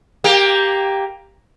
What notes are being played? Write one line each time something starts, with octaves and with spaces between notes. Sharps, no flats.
A#3 G4